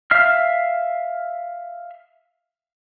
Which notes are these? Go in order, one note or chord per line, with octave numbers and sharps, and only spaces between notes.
E5 F5 F6